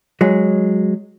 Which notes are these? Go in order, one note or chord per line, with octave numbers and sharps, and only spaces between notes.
F#3 G#3